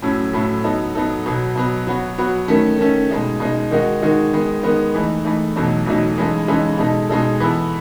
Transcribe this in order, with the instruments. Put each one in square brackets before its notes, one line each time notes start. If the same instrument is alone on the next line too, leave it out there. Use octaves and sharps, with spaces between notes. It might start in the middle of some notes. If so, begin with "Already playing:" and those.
[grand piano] A2 F#3 A3 C#4 E4
A2 F#3 A3 C#4 E4
F#3 B3 D#4 A4
F#3 B3 D#4 A4
B2 F#3 B3
B2 F#3 B3
F#3 B3 F#4
F#3 B3 F#4
D#3 A3 C#4
D#3 A3 C#4
B2 G#3 D#4
B2 G#3 D#4
D#3 G#3 D#4 F#4
D#3 G#3 D#4 F#4
D#3 G#3 B3
D#3 G#3 B3
E3 A3 D#4
E3 A3 D#4
E2 B2 F#3 A3 D#4
E2 B2 F#3 A3 D#4
C#3 E3 G#3 D#4 A4
C#3 E3 G#3 D#4 A4
B2 G#3 D#4 A4
B2 G#3 D#4 A4
E3 B3 E4 A4